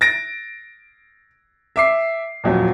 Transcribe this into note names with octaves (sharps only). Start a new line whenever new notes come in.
A6 A#6 D7
E5 D6 C7
D#1 F2 F#3